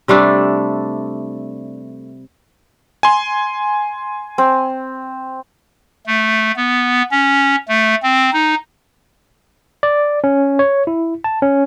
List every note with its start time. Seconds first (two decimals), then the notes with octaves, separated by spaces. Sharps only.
0.08 C3 G3 A3 D4
3.03 G#5 C6
4.38 C4
6.06 A3
6.56 B3
7.11 C#4
7.68 A3
8.03 C4
8.33 D#4
9.83 D5
10.24 C#4
10.59 C#5
10.87 E4
11.24 A5
11.42 C#4